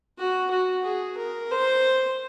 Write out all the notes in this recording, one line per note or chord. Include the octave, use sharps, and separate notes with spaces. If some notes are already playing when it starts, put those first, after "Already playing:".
F#4
F#4
G#4
A#4
C5